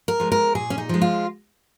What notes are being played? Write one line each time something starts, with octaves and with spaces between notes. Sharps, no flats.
A#4
F3 G#3
A#4
A#2 G#4
C#4
D#4
F3 G#3
F4